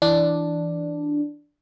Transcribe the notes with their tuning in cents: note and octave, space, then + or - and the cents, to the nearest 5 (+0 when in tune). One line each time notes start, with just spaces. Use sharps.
E3 +0 D4 +0